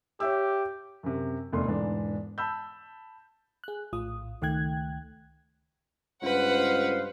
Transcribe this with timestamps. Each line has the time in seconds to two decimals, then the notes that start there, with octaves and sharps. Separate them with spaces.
0.20 G4 C#5 E5 E6
1.03 F#2 C3
1.52 F1 E2 A3 D4 C6
1.67 E1 G#2 E3 D4
2.38 A5 B5 E6 G6
3.64 G#4 F#6
3.93 A#1 A2 F4 D#6
4.42 C#2 D#3 A3 G5 F#6 G#6
6.23 C#2 G2 B4 C5 F5 F#5